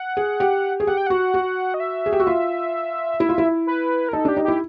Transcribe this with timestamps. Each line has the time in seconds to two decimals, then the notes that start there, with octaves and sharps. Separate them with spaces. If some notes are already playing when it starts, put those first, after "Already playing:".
Already playing: F#5
0.17 G#4
0.40 G4
0.80 G#4
0.87 G4 F#5
0.97 G5
1.07 F#4 F#5
1.34 F#4
1.74 D#5
1.80 E5
2.06 G#4
2.13 G4
2.20 F#4
2.27 F4
3.20 E4
3.29 F4
3.38 E4
3.67 B4
4.09 A#4
4.13 D#4 A4
4.25 D4 G4
4.37 D#4
4.44 E4 G4